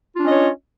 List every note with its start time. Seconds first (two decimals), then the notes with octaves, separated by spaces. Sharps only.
0.16 F4
0.19 D4
0.23 C#4
0.26 D#5
0.30 C#5